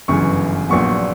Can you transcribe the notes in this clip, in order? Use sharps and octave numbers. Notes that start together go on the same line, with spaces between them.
G1 F#2 C#3 E3 C#6
A#1 A#2 F#3 B3 C#6